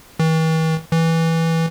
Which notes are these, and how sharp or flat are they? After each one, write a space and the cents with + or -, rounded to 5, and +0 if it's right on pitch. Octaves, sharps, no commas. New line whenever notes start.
E3 -45
E3 -10